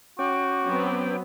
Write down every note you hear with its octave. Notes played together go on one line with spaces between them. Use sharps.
C#4 F#4 G5 D6
F#3 B3 C4